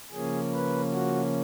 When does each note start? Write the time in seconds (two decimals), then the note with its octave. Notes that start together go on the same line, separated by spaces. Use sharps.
0.12 C#3 F3 A#3 C#4 G#4
0.53 B4
0.93 F#4